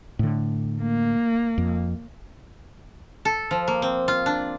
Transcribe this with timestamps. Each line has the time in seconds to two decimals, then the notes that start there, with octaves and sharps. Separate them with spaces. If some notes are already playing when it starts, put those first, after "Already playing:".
0.19 A2 D3
0.82 A#3
1.58 F2
3.25 A4
3.51 F3
3.68 A#3
3.82 C4
4.08 F4
4.26 D4